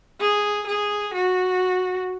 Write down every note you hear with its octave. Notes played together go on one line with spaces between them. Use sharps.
G#4
G#4
F#4